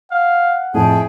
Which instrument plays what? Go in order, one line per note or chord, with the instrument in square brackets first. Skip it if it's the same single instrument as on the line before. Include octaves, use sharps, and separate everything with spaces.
[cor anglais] F5 [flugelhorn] F#5
[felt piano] F2 A2 [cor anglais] G#4 [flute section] E5 G5 A5